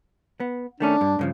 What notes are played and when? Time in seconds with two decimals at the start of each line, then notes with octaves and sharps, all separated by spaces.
0.40 B3
0.80 D#3 A3 C#4 D4
1.01 G2
1.19 G2 C#3 F3